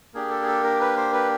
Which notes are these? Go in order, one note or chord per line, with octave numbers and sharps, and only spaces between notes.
A#3 D4 G4 G#4
A4
G#4
A4
A#4
B4
C5
B4